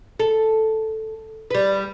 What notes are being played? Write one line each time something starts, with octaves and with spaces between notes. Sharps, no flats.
A4
G3 B4